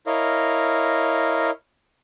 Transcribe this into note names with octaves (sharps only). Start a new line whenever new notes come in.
E4 A#4 C#5 D#5 F5